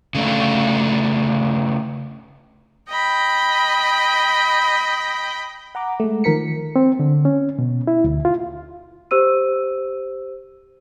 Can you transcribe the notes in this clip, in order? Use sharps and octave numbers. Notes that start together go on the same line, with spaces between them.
C#3 A3 D4
D#5 G5 B5
F#5 A#5 D6
G#3 A3
D#3 F3 A#4 B6 C#7
C4
D3
C#4
B2
E4
D2
F4
G4 C5 E6 D#7